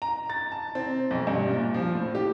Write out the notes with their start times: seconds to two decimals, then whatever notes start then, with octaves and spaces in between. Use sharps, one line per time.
0.02 A#5
0.30 A6
0.52 A5
0.75 C4
1.11 B1
1.27 G2
1.50 A#2
1.74 F3
1.95 A2
2.15 G4